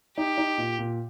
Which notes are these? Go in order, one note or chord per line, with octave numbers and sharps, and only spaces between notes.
D#4 G4
D#4
A#2
A#2